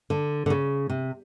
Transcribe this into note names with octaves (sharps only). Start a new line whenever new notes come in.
D3
D3
C#3
C3